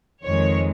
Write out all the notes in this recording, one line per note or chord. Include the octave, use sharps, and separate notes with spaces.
F2 D#3 G#3 C#5